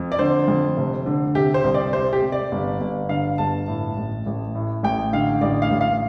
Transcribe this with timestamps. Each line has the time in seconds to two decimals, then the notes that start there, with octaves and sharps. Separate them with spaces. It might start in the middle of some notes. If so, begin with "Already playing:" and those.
Already playing: F2
0.12 D5
0.19 D3 C5
0.48 F2
0.77 F1
1.06 D3
1.35 C3 G4
1.54 C5
1.64 C2
1.74 D5
1.93 C3 C5
2.13 G4
2.22 C3
2.32 D5
2.52 G1
2.81 G1
3.09 D3 F5
3.38 G1 A5
3.68 A2
3.96 A1
4.26 A1
4.55 A2
4.83 A1 G5
5.13 D3 F5
5.41 A1 D5
5.62 F5
5.70 A1
5.81 F5